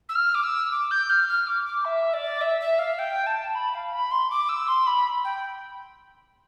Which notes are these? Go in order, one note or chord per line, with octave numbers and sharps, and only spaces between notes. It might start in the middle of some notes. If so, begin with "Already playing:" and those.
E6
F6
D6
E6
D6
G6
F6
F6
D6
D6
E5
D5
E5
E5
F5
G5
A5
B5
F5
B5
C6
D6
E6
C6
B5
G5